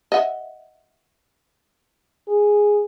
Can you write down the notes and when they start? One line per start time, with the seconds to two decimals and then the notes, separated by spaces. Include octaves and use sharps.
0.12 D#5 E5 F#5
2.28 G#4